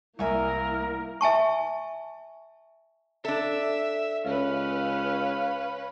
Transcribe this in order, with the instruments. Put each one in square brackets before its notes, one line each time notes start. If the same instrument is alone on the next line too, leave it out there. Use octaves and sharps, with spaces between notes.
[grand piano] C2 [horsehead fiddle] A#3 E4 [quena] A#4 [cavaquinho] E5 G#5 C#6
[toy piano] E5 G#5 A5 C#6
[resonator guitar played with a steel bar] D4 A4 [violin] E5
[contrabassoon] C#2 [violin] C#4 B4 [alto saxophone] F5